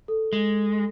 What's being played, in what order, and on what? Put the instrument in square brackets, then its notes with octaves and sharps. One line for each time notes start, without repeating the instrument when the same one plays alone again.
[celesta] A4
[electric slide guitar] G#3